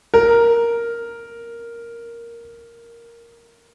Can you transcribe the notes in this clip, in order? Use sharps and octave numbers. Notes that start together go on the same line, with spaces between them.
A#4